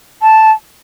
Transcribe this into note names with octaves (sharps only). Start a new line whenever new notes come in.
A5